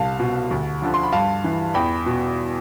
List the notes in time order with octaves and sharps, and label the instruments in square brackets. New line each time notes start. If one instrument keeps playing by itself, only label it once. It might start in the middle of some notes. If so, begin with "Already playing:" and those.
Already playing: [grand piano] C2 F5 A5
B2
D2
D3 F3
C6
B5
G2 F5 A5
E3
E2 G5 B5
B2